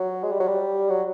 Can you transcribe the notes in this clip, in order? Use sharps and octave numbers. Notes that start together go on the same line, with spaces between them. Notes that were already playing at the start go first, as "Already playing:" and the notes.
Already playing: F#3
G#3
G3
F#3
G3
F#3